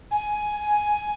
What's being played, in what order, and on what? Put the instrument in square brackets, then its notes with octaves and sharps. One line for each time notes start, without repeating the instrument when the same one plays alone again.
[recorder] G#5